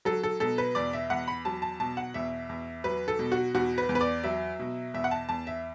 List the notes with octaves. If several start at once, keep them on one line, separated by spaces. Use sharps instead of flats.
F#3 A4
A4
B2 A4
B4
E2 D5
E5
E2 F#5
B5
F#3 A5
A5
B2 A5
F#5
E2 E5
E2
F#3 B4
A4
B2
F#4
E2 F#4
B4
E2
B4
D5
F#3 E5
B2
E2 E5
F#5
A5
E2 A5
E5